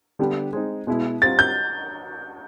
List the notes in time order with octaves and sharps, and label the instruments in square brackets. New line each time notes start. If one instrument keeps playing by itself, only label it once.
[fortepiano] D3 G3 B3 D4 G4
G#3 C4 D#4
B2 G#3 B3 E4
[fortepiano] G3 C4 F4 [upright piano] A6
[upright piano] G6